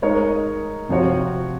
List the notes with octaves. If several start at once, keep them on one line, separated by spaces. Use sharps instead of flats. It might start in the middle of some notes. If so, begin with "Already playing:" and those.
G#3 D#4 A#4 C#5
C3 F3 C4 F#4 C#5